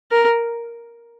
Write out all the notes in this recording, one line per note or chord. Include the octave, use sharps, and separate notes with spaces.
A#4